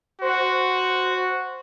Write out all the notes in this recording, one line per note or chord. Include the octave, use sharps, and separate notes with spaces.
F#4 C5